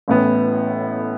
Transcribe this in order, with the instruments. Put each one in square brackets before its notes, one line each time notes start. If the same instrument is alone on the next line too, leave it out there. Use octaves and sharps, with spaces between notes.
[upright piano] A1 A2 E3 B3